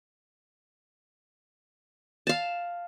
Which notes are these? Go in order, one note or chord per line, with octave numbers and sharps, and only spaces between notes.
F5 A5